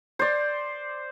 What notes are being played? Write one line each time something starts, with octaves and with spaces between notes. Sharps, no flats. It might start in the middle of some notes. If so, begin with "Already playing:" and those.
C5 D5